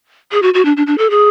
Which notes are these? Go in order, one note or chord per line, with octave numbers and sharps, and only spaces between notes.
G#4
F#4
F#4
D4
D4
D4
A4
G#4